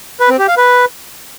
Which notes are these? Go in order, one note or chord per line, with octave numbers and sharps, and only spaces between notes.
B4
C4
G4
F5
B4